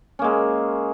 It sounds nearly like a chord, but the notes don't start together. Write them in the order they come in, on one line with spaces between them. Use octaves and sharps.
C#4 A#3 G#3